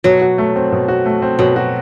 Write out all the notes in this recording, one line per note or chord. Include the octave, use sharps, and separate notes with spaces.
B2 F#3
F#4
A3
C4
B2
F#4
A3
C4
B2 F#3
F#4